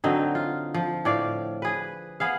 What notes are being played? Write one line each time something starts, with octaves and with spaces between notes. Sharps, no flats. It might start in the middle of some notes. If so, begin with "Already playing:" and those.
D3 F#3 C4 D#4
F4
F3
A2 D5 F5
G#4 B4
B3 G#4 F5